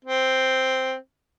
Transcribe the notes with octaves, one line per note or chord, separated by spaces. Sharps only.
C4